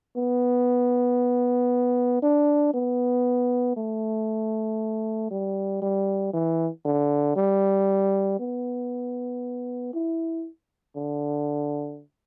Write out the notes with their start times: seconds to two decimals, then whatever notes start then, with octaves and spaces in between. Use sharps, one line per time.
0.16 B3
2.22 D4
2.74 B3
3.76 A3
5.31 G3
5.82 G3
6.33 E3
6.85 D3
7.36 G3
8.39 B3
9.94 E4
10.96 D3